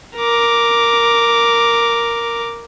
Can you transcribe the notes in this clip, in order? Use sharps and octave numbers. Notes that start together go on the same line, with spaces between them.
A#4 D6